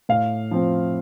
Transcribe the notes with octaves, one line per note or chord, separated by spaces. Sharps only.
A2 F5
F3 C4